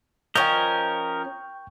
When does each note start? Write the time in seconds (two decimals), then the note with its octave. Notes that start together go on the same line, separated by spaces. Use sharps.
0.35 F3 C#4 A#4 D#5 G5 C#6 G6